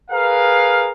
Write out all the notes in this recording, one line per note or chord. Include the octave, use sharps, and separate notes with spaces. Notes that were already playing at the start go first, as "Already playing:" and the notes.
G#4 A#4 B4 F5